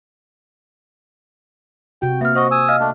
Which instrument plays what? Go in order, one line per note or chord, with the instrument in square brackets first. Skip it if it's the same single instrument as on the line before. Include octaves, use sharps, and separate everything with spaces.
[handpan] C3 F#4 [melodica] G5
[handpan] A#3 [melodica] B3 [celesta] E5 F6
[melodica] F#4 D#5 [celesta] C5 C#6
[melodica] G#5 D#6 E6
[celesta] D#5 F5 F6
[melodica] A3 D4